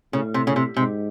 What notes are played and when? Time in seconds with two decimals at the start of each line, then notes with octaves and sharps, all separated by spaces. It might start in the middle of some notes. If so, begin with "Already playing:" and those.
0.13 A2 C#3
0.34 C3
0.47 C#3
0.56 C3
0.76 G#2 C3